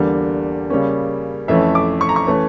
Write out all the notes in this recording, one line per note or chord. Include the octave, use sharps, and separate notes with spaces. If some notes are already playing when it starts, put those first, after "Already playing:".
Already playing: E2 D3 G3 A#3
C#3 G3 A#3 C#4
F2 E3 A3 C#4 E5
D6
C#6
A#5
C#6
E3 A3 C#4